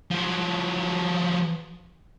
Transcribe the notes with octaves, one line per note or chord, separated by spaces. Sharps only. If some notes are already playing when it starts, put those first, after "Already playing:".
F3 F#3